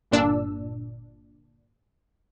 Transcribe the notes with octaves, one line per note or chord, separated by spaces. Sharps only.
G1 A#2 D4 E6